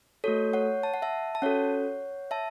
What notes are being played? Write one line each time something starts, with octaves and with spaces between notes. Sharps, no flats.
A3 F#4 A4 C#5
C#5 F#5
A5
F#5
E5 A5
A5
C#4 F#4 A4 C#5 F#5
E5 A5